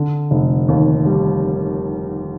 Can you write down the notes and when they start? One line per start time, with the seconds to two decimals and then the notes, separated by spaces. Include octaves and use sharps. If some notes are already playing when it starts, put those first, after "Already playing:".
Already playing: D3
0.31 F1
0.68 D#2
1.06 G3